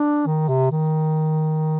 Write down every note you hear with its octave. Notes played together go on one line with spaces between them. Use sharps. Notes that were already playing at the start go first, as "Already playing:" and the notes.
Already playing: D4
D#3
C3
D#3